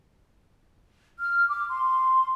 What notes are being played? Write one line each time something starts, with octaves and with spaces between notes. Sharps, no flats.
F6
D6
C6